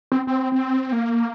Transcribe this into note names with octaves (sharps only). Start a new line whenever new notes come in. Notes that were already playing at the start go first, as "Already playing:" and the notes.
C4
C4
C4
A#3